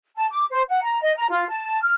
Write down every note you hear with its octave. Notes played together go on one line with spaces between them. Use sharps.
A5
D6
C5
F#5
A#5
D#5
A#5
F4
A5
F6